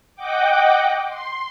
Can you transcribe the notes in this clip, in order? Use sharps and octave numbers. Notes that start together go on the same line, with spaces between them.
D#5 F#5 G5 D6
C6